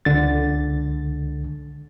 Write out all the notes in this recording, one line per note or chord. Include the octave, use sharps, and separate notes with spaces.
C#2 D3 A6